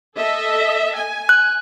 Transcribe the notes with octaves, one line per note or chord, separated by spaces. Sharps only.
A4 D#5 E5
G#5
F#6